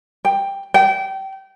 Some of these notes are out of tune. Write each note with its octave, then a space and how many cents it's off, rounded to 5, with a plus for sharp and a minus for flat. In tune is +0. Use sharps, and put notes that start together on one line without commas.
G5 +10
G5 -25